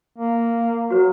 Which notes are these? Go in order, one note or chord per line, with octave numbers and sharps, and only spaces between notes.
A#3
F#3 F#4 B4